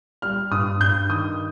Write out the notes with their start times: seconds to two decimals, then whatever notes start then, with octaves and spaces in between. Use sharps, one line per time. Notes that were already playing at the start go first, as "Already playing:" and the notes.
0.22 G3 F6
0.51 G2 D#6
0.80 G2 G6
1.09 D#3 D#6